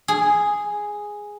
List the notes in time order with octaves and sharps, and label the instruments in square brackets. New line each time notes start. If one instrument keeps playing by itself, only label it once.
[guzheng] G#4